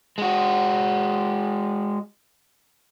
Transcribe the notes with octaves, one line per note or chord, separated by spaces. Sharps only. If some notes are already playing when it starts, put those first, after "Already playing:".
G#3 F#4